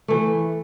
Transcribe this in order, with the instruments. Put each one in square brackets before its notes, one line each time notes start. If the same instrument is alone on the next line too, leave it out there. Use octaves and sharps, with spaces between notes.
[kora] E3 A3